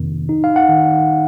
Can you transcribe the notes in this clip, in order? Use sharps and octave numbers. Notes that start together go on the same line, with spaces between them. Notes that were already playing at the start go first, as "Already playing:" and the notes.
Already playing: F2 C3 D#3 A#3
D#4
F5
F#5
D#3